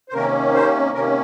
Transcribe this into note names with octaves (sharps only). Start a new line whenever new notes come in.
C5
C3 D#3 A#3 C#4 A#4
C5
C3 D#3 A#3 C#4 A#4